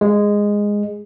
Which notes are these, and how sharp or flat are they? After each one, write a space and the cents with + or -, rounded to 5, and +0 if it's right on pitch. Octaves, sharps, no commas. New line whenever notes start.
G#3 -10